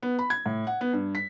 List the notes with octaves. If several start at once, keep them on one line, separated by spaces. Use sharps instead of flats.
B3
B5
G#6
A2
F#5
B3
G2
B6